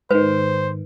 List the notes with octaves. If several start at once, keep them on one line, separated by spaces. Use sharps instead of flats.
G#2 D#3 B4 C5